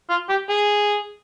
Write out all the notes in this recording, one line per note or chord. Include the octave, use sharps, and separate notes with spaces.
F4
G4
G#4